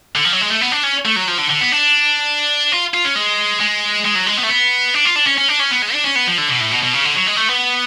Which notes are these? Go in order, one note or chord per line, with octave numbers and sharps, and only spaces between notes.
D3
F3
F#3
G#3
A3
B3
D4
C#4
A3
F#3
F3
D3
D3
B3
D4
F4
F4
C#4
G#3
G#3
G#3
F#3
G#3
B3
A3
B3
D4
F4
D4
C#4
C#4
D4
C#4
B3
G#3
D4
C#4
B3
F3
D3
B2
A2
B2
B2
C#3
D3
F#3
G#3
A3
B3